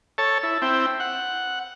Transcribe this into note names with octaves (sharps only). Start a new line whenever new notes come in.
A4 C#5 A5
E4
C4 E4 G5
F#5